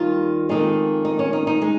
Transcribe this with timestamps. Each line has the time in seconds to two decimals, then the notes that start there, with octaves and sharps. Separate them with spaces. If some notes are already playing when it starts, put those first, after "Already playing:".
Already playing: D#2 D#3 G3 F4
0.49 F2 D#3 G#3 D#4
1.05 D#4
1.19 C#4
1.33 D#4
1.47 D#4
1.62 G#3